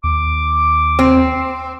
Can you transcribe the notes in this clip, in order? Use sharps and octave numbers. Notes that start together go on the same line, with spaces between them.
D#2 D6
C4